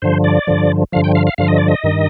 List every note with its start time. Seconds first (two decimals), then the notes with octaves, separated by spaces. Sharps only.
0.02 G2 D3 F3 C5
0.24 D5
0.47 G2 D3 F3
0.92 G2 D3 F3 F5
1.04 G5
1.15 F5
1.27 F5
1.38 G2 D3 F3 F5
1.48 D#5
1.58 D5
1.68 D#5
1.84 G2 D#3